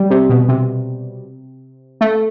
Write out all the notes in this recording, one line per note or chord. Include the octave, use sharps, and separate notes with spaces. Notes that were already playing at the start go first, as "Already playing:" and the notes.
Already playing: G3
C3
B2
C3
A3